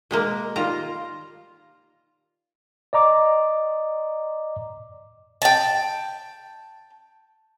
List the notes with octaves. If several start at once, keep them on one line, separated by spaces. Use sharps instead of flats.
B2 G#3 A#3
D#3 G3 F4 A#5
D5 D#5 A#5 D6
G5 A5